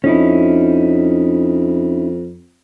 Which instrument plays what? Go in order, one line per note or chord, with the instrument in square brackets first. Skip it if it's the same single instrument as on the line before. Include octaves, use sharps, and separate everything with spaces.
[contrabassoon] F2 [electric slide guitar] C#4 D#4 E4